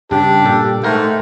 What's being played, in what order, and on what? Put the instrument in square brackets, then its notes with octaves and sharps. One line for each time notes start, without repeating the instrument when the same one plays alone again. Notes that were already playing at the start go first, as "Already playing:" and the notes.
[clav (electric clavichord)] G2 C#3 [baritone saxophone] D4 [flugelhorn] G4
[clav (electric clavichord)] A#2 G3 A4
[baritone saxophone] G#2 [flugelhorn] A3 [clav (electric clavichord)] A#4 F#5 G5